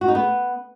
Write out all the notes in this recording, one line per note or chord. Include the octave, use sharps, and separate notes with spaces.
F#4
D#4
B3